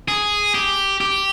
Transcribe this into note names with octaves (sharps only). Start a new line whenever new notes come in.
G#4
G4
G4